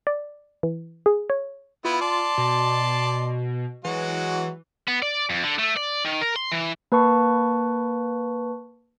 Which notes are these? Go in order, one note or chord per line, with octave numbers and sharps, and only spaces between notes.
D5
E3
G#4
C#5
B3 E4 F4
D5 A5 C6
B2
E3 F#3 G#3 F#4
B3
D5
F2
D3
A3
D5
D#3
A#4
C6
E3
A#3 B4 A5 C#6